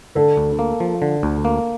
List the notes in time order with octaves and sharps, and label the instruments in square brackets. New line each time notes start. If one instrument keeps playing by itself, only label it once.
[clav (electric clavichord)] D3 [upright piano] A4
[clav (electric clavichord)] D2
A#3
F3
D3
D2
A#3